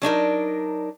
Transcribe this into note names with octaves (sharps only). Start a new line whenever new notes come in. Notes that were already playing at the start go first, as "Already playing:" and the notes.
F#3 D4 D#4 A#4